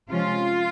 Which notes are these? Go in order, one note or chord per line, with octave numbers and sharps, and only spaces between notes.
C3 F3 G#3 C#4 F4